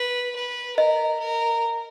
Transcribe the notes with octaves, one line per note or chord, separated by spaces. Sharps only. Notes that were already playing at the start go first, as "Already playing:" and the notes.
Already playing: B4
B4
A#4 D#5
A#4